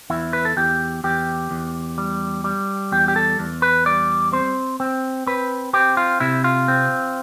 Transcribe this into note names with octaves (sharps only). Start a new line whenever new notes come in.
E2 E4
B4
A4
E2 G4
E2 G4
E2
G3
G3
E2 G4
G4
A4
E2
B4
G3 D5
C4 C5
C4
C4 B4
C4 G4
F4
C3 E4
F4
C4